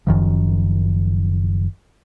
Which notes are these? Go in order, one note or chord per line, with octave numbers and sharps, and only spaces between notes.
F#1 F#2 D#3 F3